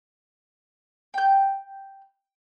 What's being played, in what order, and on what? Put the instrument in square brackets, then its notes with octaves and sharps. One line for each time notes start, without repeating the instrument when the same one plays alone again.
[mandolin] G5 G6